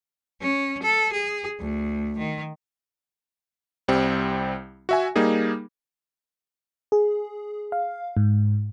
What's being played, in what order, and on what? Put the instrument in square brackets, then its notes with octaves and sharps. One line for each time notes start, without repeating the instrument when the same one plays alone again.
[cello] C#4
A4
G#4
D2
D#3
[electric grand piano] C2 G3 C4
F#4 E5 G#5
G3 A#3 D#4 G#4
[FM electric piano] G#4
F5
G#2